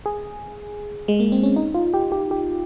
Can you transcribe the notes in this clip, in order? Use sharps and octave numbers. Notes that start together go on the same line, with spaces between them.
G#4
G#3
A#3
C4
C#4
D#4
F4
G4
G4
G4